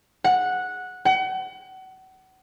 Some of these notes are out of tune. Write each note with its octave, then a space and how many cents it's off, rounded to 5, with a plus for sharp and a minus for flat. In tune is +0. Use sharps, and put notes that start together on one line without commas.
F#5 -10
F#5 +35